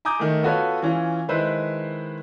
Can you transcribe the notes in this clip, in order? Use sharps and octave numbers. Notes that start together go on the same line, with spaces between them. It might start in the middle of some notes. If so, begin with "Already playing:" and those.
G#5 A#5 D6 D#6 G6
D#3 A3
B3 F4 F#4 A4 B4 C#5
E3 C#4 F4
D#3 G#3 E4 B4 C5